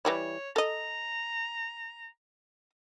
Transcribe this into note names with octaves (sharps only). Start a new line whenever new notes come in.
E3 G3 E4 C#5
A4 D#5 A#5